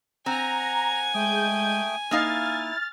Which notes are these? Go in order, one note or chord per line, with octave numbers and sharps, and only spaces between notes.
C4 F#5 G#5 A#5
G#3 A3 G5 D#6 G6
A#3 D#4 E4 F5 F6 A6